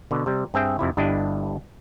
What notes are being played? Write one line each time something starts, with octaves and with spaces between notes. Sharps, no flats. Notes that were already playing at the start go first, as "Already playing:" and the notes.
B2 D3
C3 G3
G2 C4 G#4 E5 G5
F2 C3 E4
G1 G2 D4 E4 D#5